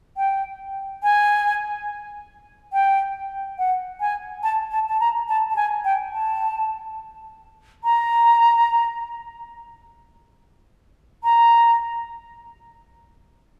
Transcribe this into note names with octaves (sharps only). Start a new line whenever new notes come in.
G5
G#5
G5
F#5
G#5
A5
A5
A5
A#5
A5
A5
G#5
G5
A5
A#5
A#5